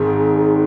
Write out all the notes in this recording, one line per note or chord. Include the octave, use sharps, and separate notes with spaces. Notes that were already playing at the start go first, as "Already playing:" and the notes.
Already playing: G#1 G#2 D#3 G#4